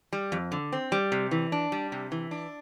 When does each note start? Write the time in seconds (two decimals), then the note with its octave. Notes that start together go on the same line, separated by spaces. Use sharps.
0.13 G3
0.32 F2
0.52 D3
0.73 C4
0.92 G3
1.12 C3
1.31 E3
1.52 D4
1.72 G3
1.92 C3
2.12 E3
2.31 D4